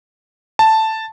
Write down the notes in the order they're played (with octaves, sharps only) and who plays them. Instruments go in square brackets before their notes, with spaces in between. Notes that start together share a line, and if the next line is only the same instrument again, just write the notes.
[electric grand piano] A5